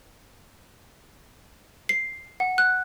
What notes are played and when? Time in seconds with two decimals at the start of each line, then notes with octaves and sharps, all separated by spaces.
1.89 C7
2.40 F#5
2.58 F#6